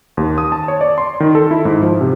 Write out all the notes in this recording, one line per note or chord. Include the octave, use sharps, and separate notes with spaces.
D#2
D#6
A5
C#5
D5
C6
D#3
A4
E4
G#2
F3
C3